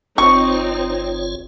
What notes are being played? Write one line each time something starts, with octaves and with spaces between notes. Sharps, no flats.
G1 C4 D#4 F4 C#5 C#6